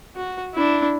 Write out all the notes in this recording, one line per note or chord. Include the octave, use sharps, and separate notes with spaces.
F#4
D4 E4